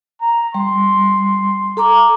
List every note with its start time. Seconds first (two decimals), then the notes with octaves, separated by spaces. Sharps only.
0.21 A#5
0.54 G3 C6
1.77 A4 A#5 D6